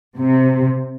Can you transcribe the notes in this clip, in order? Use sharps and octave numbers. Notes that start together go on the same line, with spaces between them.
C3